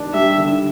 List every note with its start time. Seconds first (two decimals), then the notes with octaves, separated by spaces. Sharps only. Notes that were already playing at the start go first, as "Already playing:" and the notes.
Already playing: D4
0.14 G3 E5
0.38 D3